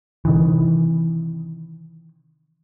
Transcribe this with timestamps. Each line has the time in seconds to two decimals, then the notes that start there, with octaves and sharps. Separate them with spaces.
0.25 C3 D#3 E3